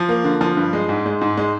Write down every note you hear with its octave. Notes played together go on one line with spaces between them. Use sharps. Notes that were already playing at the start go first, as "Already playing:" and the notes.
Already playing: F3
A#3
D3
F3
G2
G#3
G#2
G#3
G#2
G#3